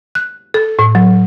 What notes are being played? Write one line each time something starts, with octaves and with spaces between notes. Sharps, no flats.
F#6
A4
A2
F#3